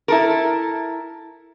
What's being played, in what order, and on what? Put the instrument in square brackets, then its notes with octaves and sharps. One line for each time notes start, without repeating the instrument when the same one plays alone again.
[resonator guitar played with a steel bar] E4 A4 A#4